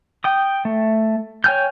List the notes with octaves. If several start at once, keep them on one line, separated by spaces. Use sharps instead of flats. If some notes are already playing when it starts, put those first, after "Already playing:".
G5 D#6
A3
C#5 G5 G#5 F6 G6